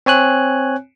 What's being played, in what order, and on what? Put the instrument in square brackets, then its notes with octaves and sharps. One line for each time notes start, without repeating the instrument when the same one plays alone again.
[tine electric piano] C4 C#5 G#5 F#6